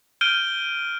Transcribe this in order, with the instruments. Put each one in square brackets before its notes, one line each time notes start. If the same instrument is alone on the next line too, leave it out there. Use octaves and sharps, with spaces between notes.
[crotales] F6 G6 D7 D#7 G7